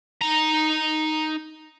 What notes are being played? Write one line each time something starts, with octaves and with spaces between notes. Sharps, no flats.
D#4 A#5